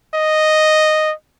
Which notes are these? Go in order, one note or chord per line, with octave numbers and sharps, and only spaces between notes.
D#5